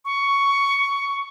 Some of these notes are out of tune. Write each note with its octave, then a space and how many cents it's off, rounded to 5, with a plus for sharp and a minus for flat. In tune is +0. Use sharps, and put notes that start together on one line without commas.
C#6 +10